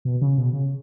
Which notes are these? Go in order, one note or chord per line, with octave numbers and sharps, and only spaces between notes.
B2
C#3
B2
C#3